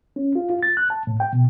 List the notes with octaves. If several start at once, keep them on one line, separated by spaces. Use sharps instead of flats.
C#4
F4
F4
A6
F#6
A5
A2
G5
B2